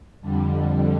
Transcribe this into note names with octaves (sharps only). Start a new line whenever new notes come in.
F2 D3 G3